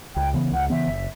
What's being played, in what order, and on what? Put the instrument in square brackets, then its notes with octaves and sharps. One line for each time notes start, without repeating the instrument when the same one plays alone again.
[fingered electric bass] C#2 [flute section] G5
[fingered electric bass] C#3 E3 B3
[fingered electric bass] C#2 [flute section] F#5
[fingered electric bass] C#3 E3 B3 [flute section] E5
[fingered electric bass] F#1